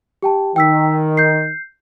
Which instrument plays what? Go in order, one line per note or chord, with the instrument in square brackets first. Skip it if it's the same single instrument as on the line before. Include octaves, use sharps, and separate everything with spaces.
[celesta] G4 G5 A5
[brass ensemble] D#3 [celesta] G5 E6 B6
[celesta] G6 C7